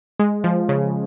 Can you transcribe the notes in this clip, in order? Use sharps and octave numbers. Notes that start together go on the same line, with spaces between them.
G#3
F3
C#3